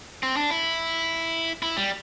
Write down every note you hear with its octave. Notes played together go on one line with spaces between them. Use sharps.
C4
D4
E4
E4
G3